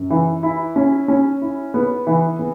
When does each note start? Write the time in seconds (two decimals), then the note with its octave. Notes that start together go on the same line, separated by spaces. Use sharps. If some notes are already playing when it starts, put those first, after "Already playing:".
Already playing: F#2
0.10 E3
0.43 E4
0.76 C#4
1.08 C#4
1.42 E4
1.74 B3
2.07 E3
2.39 B3